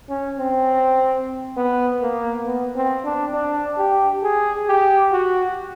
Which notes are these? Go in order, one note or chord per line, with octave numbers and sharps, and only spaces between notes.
C#4
C4
B3
A#3
B3
C4
D4
D4
G4
G#4
G4
F#4